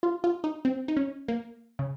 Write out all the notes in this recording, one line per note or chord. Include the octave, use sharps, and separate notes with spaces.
F4
F4
D#4
C4
D#4
C#4
A#3
C#3